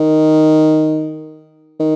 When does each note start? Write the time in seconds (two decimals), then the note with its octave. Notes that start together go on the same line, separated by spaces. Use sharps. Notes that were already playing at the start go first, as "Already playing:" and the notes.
Already playing: D#3
1.79 D#3